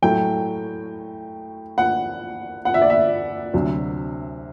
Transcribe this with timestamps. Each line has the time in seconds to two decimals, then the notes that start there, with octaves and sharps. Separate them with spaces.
0.02 A2 F#3 A3 G5
1.78 F#5
2.65 F#5
2.74 E5
2.82 D5
2.90 E5
3.54 D2 C3 F#3